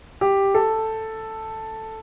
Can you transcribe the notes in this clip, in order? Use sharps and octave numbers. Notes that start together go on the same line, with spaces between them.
G4
A4